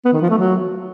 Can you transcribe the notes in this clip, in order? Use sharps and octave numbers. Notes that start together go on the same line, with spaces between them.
B3
D#3
F3
A3
F#3